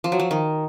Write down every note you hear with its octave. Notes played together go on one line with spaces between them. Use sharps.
F3
F#3
F3
D#3